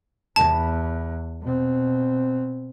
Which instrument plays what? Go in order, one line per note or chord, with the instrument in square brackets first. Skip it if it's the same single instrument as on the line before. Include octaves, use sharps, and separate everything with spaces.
[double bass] E2 [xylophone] A5
[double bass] B2 C4